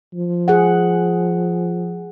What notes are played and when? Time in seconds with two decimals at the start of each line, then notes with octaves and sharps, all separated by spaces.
0.14 F3
0.48 G#4 F#5